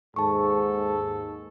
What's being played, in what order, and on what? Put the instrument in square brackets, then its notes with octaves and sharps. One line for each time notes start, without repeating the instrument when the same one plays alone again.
[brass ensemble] D#2 G#4 A4 [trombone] G#2 [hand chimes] A5 C#6